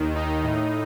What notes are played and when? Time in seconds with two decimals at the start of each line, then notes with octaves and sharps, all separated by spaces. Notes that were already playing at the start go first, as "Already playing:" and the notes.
Already playing: D#2 D#3
0.15 D#4
0.43 A2